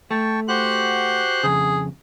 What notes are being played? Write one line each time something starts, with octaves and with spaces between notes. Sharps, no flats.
A3 G5 A5 C#6
F#4 G4 C5 F#5 F#6
F2 C#3 G#4